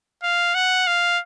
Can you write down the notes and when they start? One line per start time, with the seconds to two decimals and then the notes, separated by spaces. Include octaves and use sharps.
0.23 F5
0.55 F#5
0.87 F5